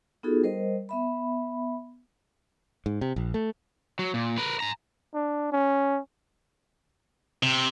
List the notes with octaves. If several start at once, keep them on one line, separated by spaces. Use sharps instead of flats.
B3 D#4 F4 F#4 G#4 A4
G3 A#4 C5 D#5
B3 E5 B5
G#2
C3
A#1
A3
F#3
A#2
A#4 B4
G#5 A#5
D4
C#4
C3